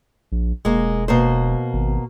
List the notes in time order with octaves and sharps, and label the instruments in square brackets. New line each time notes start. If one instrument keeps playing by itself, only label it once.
[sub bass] A#1
[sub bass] E1 [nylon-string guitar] G#3 A#3
[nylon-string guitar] B2 A#3 C5
[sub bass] G#1